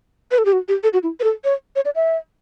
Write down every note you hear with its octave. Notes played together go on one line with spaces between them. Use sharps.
B4
A4
G4
F#4
G4
A4
F#4
E4
B4
A4
C#5
C#5
D5
E5